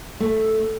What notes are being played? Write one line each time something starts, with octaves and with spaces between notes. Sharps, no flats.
A3